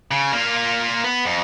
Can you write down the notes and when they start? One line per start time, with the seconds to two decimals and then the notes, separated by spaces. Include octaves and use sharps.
0.11 C#3
0.32 A#3 F4
1.04 B3
1.25 F2